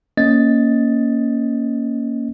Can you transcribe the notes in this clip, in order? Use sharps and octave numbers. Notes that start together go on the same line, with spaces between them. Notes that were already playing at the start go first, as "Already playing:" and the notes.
A#3 C#4 D#5 A6